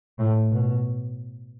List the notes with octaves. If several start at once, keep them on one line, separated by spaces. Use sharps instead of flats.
A2
B2